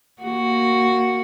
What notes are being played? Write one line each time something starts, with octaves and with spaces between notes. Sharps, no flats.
A#3 F#4